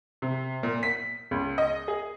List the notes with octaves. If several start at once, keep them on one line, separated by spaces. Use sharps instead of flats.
C3
A#2
B6
C#2
D#5
G#4